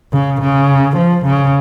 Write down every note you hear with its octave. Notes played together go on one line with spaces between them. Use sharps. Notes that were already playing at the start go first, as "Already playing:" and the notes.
C#3
C#3
F3
C#3